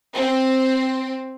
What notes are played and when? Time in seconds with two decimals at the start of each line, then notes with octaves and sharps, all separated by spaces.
0.14 C4